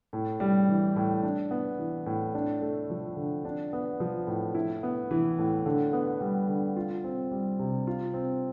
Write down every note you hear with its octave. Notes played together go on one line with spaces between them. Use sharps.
A2
G3
E3
A2
D4
B3
E3
A2
D4
A3
F3
D3
D4
B3
F3
A2
E4
B3
E3
A2
D3
B3
G3
D3
F4
C4
G3
C3
F4
C4